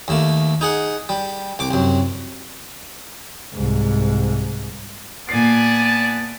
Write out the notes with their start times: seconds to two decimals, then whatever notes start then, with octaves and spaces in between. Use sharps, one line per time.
0.08 D#2 A3 A#3
0.61 D#4 G#4 F#5
1.09 G3
1.59 C2 D6
1.71 C2 F#2
3.53 C2 G#2
5.29 A#2 B3 D5 G#5 A5 C7